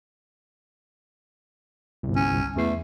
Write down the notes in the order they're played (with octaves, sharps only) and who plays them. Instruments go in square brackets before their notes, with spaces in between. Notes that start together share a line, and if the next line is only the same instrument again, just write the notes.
[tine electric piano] G1 C2
[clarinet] C#4
[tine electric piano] E2 E3 C7 [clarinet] A3